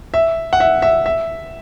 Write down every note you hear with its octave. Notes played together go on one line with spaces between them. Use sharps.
E5
F#5
E5
E5
E5